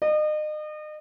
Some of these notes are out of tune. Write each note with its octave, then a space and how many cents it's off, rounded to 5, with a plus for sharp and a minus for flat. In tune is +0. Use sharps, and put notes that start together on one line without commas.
D#5 -35